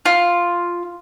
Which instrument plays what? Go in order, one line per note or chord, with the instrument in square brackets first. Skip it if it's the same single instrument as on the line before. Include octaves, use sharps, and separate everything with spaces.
[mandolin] F4